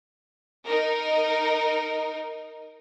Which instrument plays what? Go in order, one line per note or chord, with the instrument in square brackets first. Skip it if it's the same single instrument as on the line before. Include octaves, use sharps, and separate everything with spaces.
[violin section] D#4 A#4